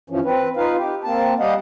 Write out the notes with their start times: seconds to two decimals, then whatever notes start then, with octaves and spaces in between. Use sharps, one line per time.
0.10 G2 E3 F3 C#4
0.25 C4 B4
0.57 D#4 F4 B4 F5
0.77 G4
1.04 A#3 C4 A5
1.39 G3 G4 D#5 F5 F#5